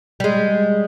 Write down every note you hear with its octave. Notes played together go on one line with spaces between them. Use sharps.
G3 G#3